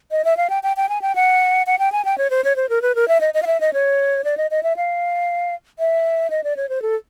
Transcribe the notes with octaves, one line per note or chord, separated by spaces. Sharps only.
D#5
E5
F5
G5
G5
G5
G#5
G5
F#5
F#5
G5
G#5
G5
C#5
C5
C#5
C5
A#4
B4
A#4
E5
D#5
D#5
F5
E5
D#5
C#5
D5
D#5
D#5
E5
F5
E5
D#5
D5
C#5
C5
A4